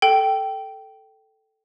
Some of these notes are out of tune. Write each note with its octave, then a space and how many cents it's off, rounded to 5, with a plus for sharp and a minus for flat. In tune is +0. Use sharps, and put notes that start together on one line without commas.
A4 +0 G5 -15